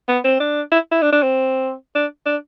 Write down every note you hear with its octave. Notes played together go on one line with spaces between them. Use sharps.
B3
C4
D4
E4
E4
D4
D4
C4
D4
D4